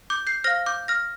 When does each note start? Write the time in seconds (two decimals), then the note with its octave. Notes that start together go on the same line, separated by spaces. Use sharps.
0.10 D6 G6
0.27 G6 C7
0.44 C5 F5 F6 A#6
0.66 D6 G6
0.88 F6 A#6